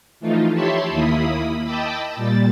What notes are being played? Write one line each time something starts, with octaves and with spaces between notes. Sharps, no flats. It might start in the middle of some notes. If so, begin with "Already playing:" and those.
E3 F3 A3 D#4 F4
G4 C#5 E5 A5 B5 C6
D#2 A#3 E4 B5 D#6
D#5 G5 A5 B5 D6 E6
A#2 G3 A6